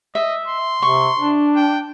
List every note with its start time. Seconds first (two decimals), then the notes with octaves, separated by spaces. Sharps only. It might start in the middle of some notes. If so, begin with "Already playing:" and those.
0.15 D#5 E5
0.48 C6
0.82 C3 C#6
1.17 D4
1.56 G5